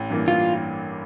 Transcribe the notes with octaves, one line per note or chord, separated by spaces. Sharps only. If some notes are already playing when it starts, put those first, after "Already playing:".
Already playing: A1
G2 E3 A#3
F4